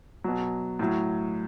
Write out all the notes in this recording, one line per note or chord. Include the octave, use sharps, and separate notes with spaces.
B2 F#3
A2 F#3